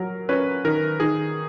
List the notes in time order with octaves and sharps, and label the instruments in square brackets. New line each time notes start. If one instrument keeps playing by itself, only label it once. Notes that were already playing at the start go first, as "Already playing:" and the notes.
Already playing: [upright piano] F#3 [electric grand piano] A#4
[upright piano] C#4 [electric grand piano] B4
[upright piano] D#3 [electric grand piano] A#4
[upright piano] D#3 [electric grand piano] G#4